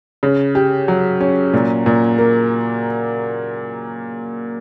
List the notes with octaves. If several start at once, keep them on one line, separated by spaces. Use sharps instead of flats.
C#3
G4
F#3
C#4
A#2
A#2
A#3